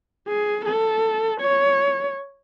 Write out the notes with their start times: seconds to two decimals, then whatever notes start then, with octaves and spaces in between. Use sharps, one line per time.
0.28 G#4
0.65 A4
1.41 C#5